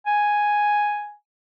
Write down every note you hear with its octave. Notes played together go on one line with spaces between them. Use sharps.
G#5